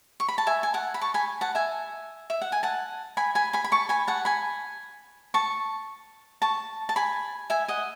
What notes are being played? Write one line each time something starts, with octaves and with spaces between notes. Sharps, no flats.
C#6
B5
A5
E5 G#5
G#5
F#5 A5
B5
A5 C#6
G#5 B5
F#5 A5
E5 G#5
E5
F#5
G#5
F#5 A5
G#5 B5
G#5 B5
G#5 B5
B5
A5 C#6
G#5 B5
F#5 A5
G#5 B5
A5 C#6
A5 C#6
A5
G#5 B5
E5 G#5
D#5 F#5